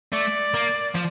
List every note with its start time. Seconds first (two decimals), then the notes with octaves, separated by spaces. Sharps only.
0.12 A3 D5
0.54 A#3
0.95 F3